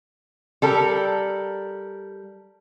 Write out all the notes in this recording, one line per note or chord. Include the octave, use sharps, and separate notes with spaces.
G3 A4 A#4